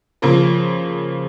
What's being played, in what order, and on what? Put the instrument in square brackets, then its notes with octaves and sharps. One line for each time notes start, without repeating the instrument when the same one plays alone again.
[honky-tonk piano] C#3 F3 A#3